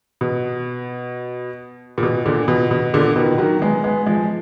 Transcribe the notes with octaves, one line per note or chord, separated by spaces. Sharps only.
B2
A#2
B2
A#2 D3
B2
B2
A#2 D3
B2 D#3
D#3 F#3
G#3 B3
G#3 B3
F3 G#3